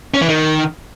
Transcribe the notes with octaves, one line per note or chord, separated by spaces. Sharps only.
C#4
E3
D#3